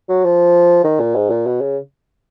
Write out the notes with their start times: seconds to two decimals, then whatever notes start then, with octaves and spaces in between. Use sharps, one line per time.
0.09 F#3
0.24 F3
0.84 D#3
0.99 A#2
1.15 G#2
1.30 A#2
1.46 B2
1.61 C#3